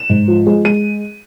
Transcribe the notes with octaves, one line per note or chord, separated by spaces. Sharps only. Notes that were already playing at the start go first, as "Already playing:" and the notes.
Already playing: E7
G#2
F3
G#3
G#3 D#7